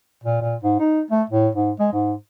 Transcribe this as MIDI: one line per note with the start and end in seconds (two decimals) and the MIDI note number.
0.24 0.40 46
0.41 0.56 46
0.63 0.75 44
0.79 1.01 63
1.11 1.23 57
1.30 1.49 45
1.55 1.72 44
1.79 1.88 56
1.93 2.14 44